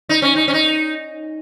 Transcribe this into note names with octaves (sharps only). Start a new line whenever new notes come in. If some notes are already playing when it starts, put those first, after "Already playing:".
D#4
C#4
D#4
C#4
D#4